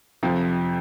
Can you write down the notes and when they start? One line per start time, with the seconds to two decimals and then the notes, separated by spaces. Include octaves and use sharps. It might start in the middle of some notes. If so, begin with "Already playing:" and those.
0.23 F2 C3 F3